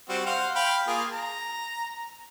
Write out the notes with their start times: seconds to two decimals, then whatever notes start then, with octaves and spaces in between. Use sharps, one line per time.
0.09 G3 C4 F#4
0.26 C5 F5 F#5
0.55 F5 G5 B5
0.87 A#3 F4 G#4
1.12 A#5